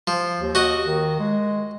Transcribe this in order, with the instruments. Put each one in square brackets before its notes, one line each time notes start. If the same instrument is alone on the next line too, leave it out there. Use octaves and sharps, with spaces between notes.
[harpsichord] F3
[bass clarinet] D#2
[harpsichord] F#4 D#5
[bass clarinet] D#3
G#3